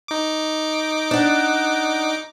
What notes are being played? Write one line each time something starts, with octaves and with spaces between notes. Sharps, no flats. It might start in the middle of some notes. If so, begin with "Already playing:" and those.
D#4 D6
D4 F#5